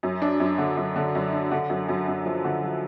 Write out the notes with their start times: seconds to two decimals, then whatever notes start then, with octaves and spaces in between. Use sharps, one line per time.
0.03 F#2
0.22 D4
0.40 F#2
0.58 D3
0.77 F#2
0.96 D3
1.15 F#2
1.33 D4
1.51 D3
1.70 F#2
1.89 F#2
2.08 F#2
2.25 F3
2.44 D3
2.64 F3